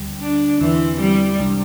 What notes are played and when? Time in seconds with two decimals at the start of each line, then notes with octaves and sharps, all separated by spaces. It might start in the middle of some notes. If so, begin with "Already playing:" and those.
Already playing: D2 D3 G3
0.22 D4
0.60 E2 D3 E3 C4 E4
1.01 G3
1.39 C2 C3 G3 D4